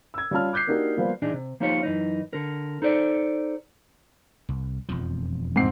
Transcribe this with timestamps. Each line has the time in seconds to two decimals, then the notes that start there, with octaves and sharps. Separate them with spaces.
0.14 E6 G#6
0.31 G3 C#4 F4 A5 F6
0.53 D6 F#6 G6 B6 C7
0.67 A#3 D4 D#4 F#4 G4 A#4
0.97 F3 G3 A#3 B3 F4 C5
1.22 A#2 E3 D4 D#4 G#4
1.34 C3
1.60 F3 A#3 D#4 F4 G4 C#5
1.83 F#2 E3 D#4
2.33 D3 A#4
2.82 D#4 A4 C5 D5
4.49 C2
4.89 E1 F2 F3
5.56 G#2 C4 C7